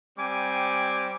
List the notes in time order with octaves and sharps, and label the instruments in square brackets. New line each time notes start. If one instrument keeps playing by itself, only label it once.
[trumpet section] G3 C4 G#5 D6